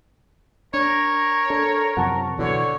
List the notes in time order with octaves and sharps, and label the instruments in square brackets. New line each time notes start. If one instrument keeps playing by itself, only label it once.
[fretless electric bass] D4 [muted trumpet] A#4 [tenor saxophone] C#5
[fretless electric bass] D4 [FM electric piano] A4
[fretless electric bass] F#2 C3 F3 [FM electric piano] F#5 A5 C#6
[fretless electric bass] B2 E3 F#3 [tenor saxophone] D3 [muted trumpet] C#5